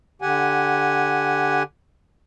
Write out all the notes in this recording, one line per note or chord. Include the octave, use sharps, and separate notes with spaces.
D3 G4 F#5 G#5